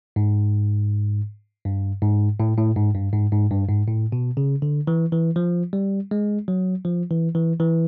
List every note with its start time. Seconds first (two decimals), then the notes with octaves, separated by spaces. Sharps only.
0.16 G#2
1.65 G2
2.02 G#2
2.40 A2
2.57 A2
2.76 G#2
2.95 G2
3.13 G#2
3.32 G#2
3.50 G2
3.69 G#2
3.88 A2
4.12 B2
4.37 C#3
4.62 D3
4.87 E3
5.12 E3
5.36 F3
5.73 G3
6.11 G#3
6.48 F#3
6.85 F3
7.11 E3
7.35 E3
7.60 E3